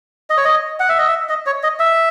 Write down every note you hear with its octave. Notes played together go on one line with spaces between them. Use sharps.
D#5
C#5
D#5
F#5
E5
D#5
E5
D#5
C#5
D#5
E5